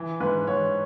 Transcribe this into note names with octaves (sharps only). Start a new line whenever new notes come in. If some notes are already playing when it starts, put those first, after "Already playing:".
Already playing: E3
G#2 B4
G#2 C#5